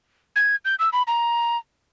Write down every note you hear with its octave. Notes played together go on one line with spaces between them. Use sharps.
G#6
G6
E6
B5
A#5